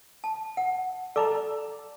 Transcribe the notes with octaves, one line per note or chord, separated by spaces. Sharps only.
A5
F#5
A4 D5 A5 A#5 D6